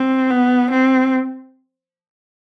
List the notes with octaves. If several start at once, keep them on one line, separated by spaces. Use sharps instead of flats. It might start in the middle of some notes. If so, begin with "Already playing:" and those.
Already playing: C4
B3
C4